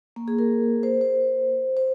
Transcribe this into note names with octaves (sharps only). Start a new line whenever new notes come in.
A#3
G#4
A#4
C5
C5
C5